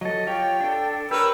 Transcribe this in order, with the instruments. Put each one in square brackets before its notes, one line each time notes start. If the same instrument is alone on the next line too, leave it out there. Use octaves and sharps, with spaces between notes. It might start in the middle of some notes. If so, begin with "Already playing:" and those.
[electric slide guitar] F#3 A4 [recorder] D#5
[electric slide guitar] F4 G4 C#5 [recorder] G5
[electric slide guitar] D4 A4
[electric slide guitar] G4 C#5 [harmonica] A#4 B4 [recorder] E6